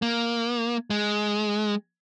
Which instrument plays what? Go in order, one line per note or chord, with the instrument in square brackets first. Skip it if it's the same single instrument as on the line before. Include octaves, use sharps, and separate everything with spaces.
[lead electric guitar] A#3
G#3